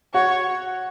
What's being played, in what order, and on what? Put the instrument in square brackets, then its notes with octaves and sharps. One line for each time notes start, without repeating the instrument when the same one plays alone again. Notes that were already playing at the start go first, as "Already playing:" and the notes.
[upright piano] F#4 [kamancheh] C#5